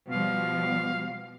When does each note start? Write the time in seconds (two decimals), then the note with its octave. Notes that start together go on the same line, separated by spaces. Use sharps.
0.11 B2 F3 G3 F5